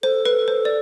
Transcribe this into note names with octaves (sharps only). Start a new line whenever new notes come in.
A4 C5
B4
C5
D5